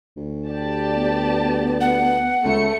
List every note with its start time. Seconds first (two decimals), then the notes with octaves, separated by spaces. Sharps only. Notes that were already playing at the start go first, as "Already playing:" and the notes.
0.16 D2
0.48 G4 D5 A5
0.93 B3
1.81 F#5
2.44 C#2 A3 C#7